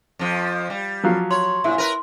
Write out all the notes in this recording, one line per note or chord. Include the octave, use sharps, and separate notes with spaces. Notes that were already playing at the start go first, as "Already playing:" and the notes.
F2 F3
G3
F3 F#3 F5
C#5 C6
A#2 E4
A#4 B4